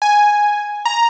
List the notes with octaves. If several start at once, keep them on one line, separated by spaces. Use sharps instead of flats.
G#5
A#5